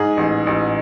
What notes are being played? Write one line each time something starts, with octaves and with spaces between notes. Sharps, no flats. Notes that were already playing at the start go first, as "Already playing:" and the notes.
Already playing: G#2 G#4
A1
A1